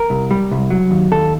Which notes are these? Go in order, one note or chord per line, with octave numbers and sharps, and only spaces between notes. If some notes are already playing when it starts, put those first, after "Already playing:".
Already playing: A#4
C2
G3
C2
F#3
D#2
D#2 A4